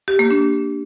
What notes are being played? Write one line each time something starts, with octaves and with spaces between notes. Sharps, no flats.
G4
A#3
D4